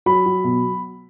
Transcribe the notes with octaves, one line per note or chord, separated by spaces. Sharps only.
F#3 B5
F#3
B2